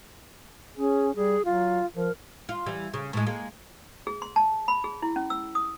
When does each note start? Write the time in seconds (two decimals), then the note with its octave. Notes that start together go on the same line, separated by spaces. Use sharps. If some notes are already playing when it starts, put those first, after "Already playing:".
0.78 C#4 G#4
1.16 G3 G#4
1.45 F#3 F4
1.96 F3 A#4
2.49 F4
2.66 E3 G3
2.94 C#3
3.13 A2 G#3
3.26 G#3 A#3
4.07 G#4
4.22 C6
4.36 A5
4.68 B5
4.84 G#4
5.02 E4
5.16 C#4
5.30 E6
5.55 D#6